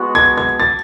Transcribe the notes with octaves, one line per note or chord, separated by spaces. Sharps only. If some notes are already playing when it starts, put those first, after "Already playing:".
Already playing: G#3 B3 F#4
G#6
G#6
A6